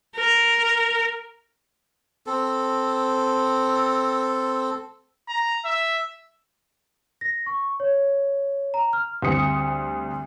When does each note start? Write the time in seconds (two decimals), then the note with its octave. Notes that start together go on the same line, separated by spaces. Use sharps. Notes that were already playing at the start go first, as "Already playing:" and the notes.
0.16 A#4
2.27 C4 A4
5.29 A#5
5.65 E5
7.21 A#6
7.46 C#6
7.80 C#5
8.74 A#5
8.93 F6
9.22 D2 G3 C4 D#6 C#7